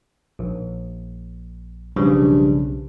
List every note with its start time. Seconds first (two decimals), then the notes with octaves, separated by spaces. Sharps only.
0.39 A#1
1.96 B1 G2 C#3 F3